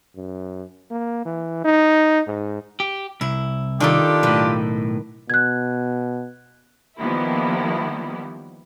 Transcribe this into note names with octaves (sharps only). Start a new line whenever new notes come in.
F#2
A#3
E3
D#4
G#2
G4
C2 E4
D#3 D4 D#4 F4 G4 A4
B1 A2 B4
B2 F#6 G#6
D#3 F3 G3 A#3 B3 E4